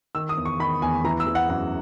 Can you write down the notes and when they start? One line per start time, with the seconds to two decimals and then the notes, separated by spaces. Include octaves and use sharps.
0.15 D#3 E6
0.29 D#6
0.37 E2
0.45 C#6
0.59 D#3 B5
0.82 E2 G#5
1.05 E3 A#5
1.20 E6
1.27 E3
1.35 F#5
1.50 F#2 F#5